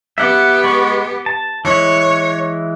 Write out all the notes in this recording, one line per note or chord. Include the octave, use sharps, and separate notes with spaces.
B3 G4 E5 F#5
G#3 B5 C#6
A5
E3 G#3 E4 C#5